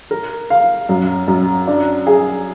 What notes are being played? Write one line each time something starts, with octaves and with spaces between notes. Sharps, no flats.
A#4
F5
F#2
F#2
D4
G#4